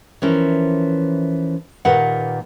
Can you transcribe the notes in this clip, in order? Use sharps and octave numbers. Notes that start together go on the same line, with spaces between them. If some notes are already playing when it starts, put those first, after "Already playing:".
E3 F3 C#4 A#4
A#2 D#3 G4 B4 F#5